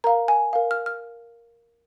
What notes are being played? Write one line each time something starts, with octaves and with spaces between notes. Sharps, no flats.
A#4 F5 A#5
G#5
A#4 F5
F6
F6